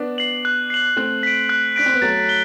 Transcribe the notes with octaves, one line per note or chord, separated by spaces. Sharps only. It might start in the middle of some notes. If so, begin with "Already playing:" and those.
Already playing: B3 D4
C7 F#7
F#6
C7 F#7
A3 C4 F#6
B6 D7
F#6
D4 B6 D7
C4
B3
F#3 A3 A6
G7